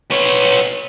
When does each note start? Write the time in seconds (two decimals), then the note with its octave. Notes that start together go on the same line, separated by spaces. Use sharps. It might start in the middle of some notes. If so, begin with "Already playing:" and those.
0.11 B3 C#5